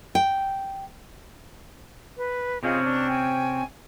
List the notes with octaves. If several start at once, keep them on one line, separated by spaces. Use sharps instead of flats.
G5
B4
C3 C4 C#4 D#4 F4 G#4
D4
G5 G#5